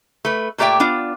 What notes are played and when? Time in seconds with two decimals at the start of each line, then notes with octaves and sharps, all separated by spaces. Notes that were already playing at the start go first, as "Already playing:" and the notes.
0.25 A3 B4
0.58 A#2 A3 G4 D5 E5 G5
0.80 B3 D4 F4